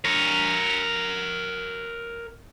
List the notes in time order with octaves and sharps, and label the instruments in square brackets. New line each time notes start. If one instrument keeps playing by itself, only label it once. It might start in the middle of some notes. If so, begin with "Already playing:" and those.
[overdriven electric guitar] A#4 C#5